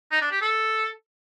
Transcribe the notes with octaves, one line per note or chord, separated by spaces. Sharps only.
D#4
D4
G4
A4